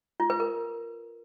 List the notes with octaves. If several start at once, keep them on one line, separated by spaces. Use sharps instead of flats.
F4
B4
A#4